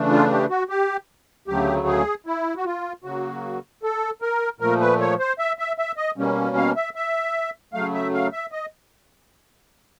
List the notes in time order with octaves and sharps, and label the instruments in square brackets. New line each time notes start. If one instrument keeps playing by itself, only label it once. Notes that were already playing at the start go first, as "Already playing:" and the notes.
Already playing: [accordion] C#3 E3 A3 D4
F4
G4
F#4
G4
D2 C#3 F#3 A3 G4
G#4
E4
F#4
F4
C#3 F#3 A#3 F#4
A4
A#4
A#2 F3 A3 A#4
B4
C#5
C5
E5
E5
E5
D#5
B2 G3 A#3 C#4
F5
E5
E5
C#3 F#3 A3 F5
E5
F5
E5
D#5